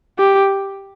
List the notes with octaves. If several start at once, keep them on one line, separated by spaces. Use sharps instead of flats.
G4